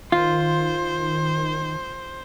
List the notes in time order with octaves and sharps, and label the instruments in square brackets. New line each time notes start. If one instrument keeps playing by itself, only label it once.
[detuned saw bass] D#3 [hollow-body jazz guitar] F4 [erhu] C5